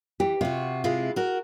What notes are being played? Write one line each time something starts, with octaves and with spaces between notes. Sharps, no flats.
E3 G4
C3 F4 F#4
G#3 E4 F4
F#4 A#4